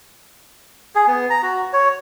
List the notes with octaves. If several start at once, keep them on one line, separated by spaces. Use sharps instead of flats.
G#4
B3
A#5
F#4
C#5